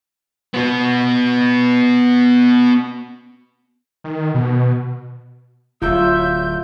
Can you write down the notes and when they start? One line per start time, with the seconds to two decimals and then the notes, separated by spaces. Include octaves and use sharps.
0.54 B3 F#4
4.04 D#3
4.34 B2
5.82 D1 F#3 F4 E5 G6